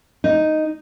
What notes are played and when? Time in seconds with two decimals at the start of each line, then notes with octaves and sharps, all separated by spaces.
0.24 D#4